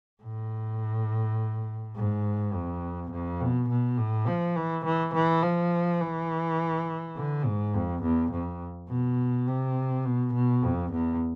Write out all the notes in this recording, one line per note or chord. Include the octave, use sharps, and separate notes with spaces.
A2
G#2
F2
F2
B2
B2
A2
F3
E3
E3
E3
F3
E3
D3
G#2
F2
E2
F2
B2
C3
B2
B2
F2
E2